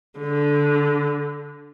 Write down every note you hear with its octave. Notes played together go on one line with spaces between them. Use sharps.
D3